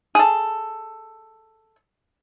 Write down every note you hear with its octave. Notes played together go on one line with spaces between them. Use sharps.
G#4 A4